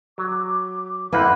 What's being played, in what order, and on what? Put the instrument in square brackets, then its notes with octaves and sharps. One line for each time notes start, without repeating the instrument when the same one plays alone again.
[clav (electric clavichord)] F#3 [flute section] D6
[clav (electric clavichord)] F2 A#3 C5 [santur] E4 F#5 C6 [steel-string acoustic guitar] B4